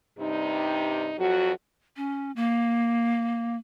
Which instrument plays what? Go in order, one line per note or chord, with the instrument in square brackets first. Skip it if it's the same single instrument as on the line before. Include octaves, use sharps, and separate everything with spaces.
[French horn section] G2 C3 G3 D#4
F2 F#3 F#4
[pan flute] C#4
A#3